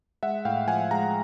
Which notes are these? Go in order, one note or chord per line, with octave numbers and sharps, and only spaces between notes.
G#3 E5 F#5
A2 F5 G5
F3 F#5 G#5
G#3 G#5 A#5